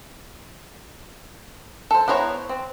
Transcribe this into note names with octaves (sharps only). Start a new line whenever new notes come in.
A4 C5
B3 E4 C5 C#5 A#5
C4